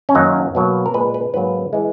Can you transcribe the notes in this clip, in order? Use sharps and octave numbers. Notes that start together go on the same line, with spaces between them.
C#4
F#2 D#3 F#3 A#3 D#4
B2 F#3 A#3
A#4
A#2 G#3 B4
B4
G#2 F#3 A#3 B4
E3 G#3